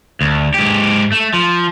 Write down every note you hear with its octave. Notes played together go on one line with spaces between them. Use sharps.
D2
G#2 G4
A3
F3